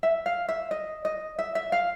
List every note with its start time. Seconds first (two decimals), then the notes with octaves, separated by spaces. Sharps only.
0.03 E5
0.26 F5
0.49 E5
0.71 D#5
1.05 D#5
1.39 E5
1.55 E5
1.72 F5